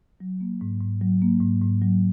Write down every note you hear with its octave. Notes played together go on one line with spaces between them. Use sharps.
F#3
A#3
G#2
G#2
F#3
A#3
G#2
G#2
F#3